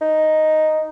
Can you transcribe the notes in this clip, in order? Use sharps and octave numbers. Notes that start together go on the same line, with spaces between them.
D#4